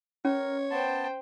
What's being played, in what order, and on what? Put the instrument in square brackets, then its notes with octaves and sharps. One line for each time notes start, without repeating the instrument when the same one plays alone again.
[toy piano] C#4 [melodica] A#4 [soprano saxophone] C#5
[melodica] B3 A5 [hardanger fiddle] C5 G5